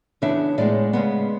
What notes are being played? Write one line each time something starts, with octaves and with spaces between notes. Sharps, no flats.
C#3 E3 B3 D4 E5
A2 G#3 B3 D5
C#3 G#3 B3